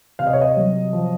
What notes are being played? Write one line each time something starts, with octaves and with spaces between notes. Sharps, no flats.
C3 F5
D#5
C#5
D#5
F#3
F3